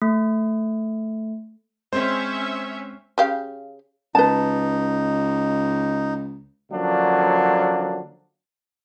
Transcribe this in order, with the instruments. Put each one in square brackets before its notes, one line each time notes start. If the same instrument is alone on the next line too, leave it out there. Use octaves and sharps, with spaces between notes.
[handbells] A3
[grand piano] G#3 C4 [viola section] C#4 E5 [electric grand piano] C5
[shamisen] C#3 G4 F5
[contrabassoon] C#2 [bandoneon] D#4 [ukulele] B4 A5
[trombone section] D3 F3 F#3 A#3 C#4 D4